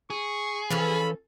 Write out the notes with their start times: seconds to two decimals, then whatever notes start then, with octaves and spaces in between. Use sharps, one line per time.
0.10 G#4 C#6
0.70 E3 F3 C#4 A4 B5